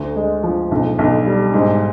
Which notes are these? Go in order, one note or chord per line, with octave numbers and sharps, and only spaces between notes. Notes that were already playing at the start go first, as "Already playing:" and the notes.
Already playing: D2
G#3
F3
B1
B1
G3
G#2